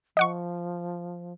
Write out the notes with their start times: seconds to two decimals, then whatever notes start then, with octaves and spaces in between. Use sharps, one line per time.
0.17 F3 D#5 F#5 C#6